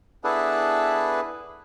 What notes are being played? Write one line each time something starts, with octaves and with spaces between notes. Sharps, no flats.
B3 D4 E4 G#4 A4 B4